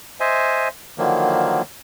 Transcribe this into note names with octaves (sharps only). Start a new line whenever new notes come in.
C5 D#5 E5 G#5
D3 D#3 F3 F#3 A#3